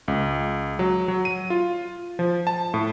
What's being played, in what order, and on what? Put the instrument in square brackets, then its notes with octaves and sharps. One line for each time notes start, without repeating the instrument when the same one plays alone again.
[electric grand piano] C#2
F#3
F#3
D#7
F4
F3
A5
A2